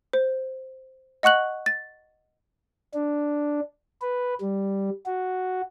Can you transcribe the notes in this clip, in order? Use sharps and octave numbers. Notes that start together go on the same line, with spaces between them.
C5
D#5 F#5 C#6 F#6 F#7
A6
D4
B4
G3
F#4